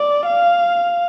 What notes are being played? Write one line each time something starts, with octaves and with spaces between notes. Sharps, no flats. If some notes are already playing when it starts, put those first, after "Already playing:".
Already playing: D5
F5